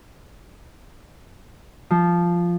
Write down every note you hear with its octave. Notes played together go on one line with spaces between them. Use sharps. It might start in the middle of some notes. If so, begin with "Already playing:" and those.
F3